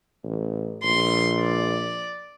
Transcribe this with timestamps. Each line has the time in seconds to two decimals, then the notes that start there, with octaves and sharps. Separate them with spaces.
0.24 A1
0.84 A#1 C6
1.41 D5